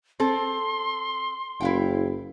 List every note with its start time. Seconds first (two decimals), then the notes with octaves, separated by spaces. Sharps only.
0.20 C4 A4 C6
1.61 F#1 E4 F5 G5